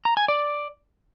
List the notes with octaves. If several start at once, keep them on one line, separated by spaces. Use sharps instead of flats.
A#5
G#5
D5